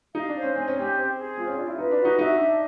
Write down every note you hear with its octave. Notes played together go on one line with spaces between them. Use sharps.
D#4 F5
D4
C5
C#4
C4 G#5
C#4
C4 G4
C5
G#4
C4 F4
C#4
D4 F4
E4
D#4 B4
D4
F#4
D#4
D#4 E5
D4